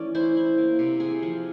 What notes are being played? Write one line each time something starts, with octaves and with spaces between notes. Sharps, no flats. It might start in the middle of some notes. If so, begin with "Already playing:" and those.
Already playing: E3 A3 C#4 D5
E4 C5
E4
A#3
C3
C3 G#4
F3